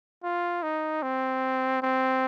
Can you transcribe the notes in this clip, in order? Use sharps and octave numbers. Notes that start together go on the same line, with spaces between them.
F4
D#4
C4
C4